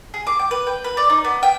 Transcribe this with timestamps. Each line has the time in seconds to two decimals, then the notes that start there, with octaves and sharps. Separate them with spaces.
0.14 G#4
0.27 D6
0.39 G5
0.51 B4
0.67 G5
0.84 B4
0.97 D5
1.10 D#4
1.24 B3
1.43 G5